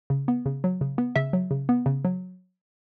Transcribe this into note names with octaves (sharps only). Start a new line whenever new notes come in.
C#3
B3
C#3
F#3
C#3
B3
C#3 E5
F#3
C#3
B3
C#3
F#3